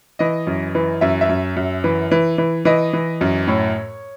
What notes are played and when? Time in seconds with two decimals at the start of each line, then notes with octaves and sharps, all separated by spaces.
0.19 E3 D#5
0.47 F#2
0.75 E3
1.01 F#2 E5
1.21 E5
1.29 F#2
1.56 F#2
1.84 E3
2.11 E3
2.38 E3
2.65 E3 D#5
2.93 E3
3.21 F#2
3.47 A2 C#5